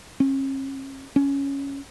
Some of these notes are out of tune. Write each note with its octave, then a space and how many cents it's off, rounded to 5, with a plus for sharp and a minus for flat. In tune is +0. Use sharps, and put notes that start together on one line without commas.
C#4 -40
C#4 +5